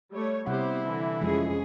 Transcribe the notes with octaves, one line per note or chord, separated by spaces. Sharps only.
G3 A3 C#5
C3 G3 B3 E4 G4 C5 F#5
D3 E3
F2 F3 G#3 C#4 G#4